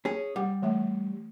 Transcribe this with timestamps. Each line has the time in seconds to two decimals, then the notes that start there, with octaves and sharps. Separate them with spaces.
0.05 C#4 G#4
0.36 G3 F#5
0.62 E3 A3 E5